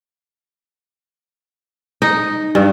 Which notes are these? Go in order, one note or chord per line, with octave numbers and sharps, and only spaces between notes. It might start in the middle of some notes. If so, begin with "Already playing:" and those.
D#4
G2